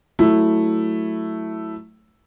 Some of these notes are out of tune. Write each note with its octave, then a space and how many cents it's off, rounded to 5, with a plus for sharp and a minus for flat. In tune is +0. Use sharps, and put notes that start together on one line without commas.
F#3 +0 A3 +0 E4 +0